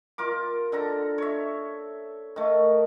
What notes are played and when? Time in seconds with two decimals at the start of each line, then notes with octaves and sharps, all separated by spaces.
0.18 F4 A#4 D6
0.72 D3 A4 A#5
1.18 C#5 E5
2.36 D#3 A3